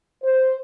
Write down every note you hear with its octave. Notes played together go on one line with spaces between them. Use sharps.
C5